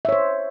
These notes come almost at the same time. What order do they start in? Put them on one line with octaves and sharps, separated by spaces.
E5 C#5 C5